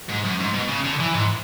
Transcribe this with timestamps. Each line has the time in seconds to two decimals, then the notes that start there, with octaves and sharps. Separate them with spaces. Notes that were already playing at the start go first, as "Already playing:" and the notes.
0.09 G#2
0.25 F#2
0.40 G#2
0.54 B2
0.69 C#3
0.84 D3
1.00 E3
1.14 G#2